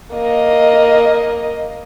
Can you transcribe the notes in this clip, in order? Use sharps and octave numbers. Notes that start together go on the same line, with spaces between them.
A#3 D#5